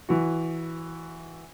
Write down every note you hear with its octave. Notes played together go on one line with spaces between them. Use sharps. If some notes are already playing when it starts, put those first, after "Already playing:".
E3 F#4